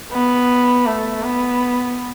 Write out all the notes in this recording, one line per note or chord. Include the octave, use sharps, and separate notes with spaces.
B3
A3
B3